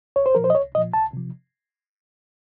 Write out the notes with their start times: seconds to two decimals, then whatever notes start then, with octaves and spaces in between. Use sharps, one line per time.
0.16 C2 C#5
0.26 C5
0.35 A#2 F3 A#4
0.44 C5
0.50 D#5
0.55 C2 C#5
0.75 A#2 F3 D#5
0.93 C2 A5
1.13 C3 F3